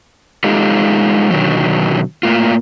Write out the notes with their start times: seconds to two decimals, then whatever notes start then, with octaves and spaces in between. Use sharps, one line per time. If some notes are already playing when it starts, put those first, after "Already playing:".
0.44 G#3 D#4 F4 G4 A4
1.31 B2 D3 D#3 F#3 G3
2.23 A2 A#3 F4